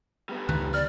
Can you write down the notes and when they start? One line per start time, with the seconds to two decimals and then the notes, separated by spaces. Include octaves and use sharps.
0.29 G3 B3
0.49 C#2 D#3 E3 F#6
0.74 D5 F6